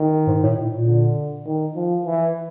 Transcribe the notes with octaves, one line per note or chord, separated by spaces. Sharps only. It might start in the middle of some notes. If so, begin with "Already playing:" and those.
Already playing: D#3
G#2
A2
A2
A#2
D3
D#3
F3
E3